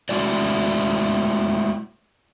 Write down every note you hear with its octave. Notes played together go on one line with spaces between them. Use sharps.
G#3 A3 E4 F#4 D5